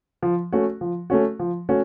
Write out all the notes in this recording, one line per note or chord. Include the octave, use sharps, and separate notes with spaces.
F3
A3 C#4 F#4
F3
A3 C#4 F#4
F3
A3 C#4 F#4